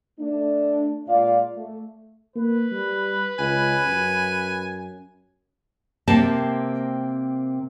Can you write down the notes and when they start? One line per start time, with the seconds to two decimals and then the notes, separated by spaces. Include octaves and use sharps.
0.19 A3 D4
1.08 A#2 G#3 F4 D5 F5
1.57 A3
2.36 A#3 B4
2.72 G3
3.39 C#2 G#5
3.86 F#2
6.07 C3 A#3 C4 A5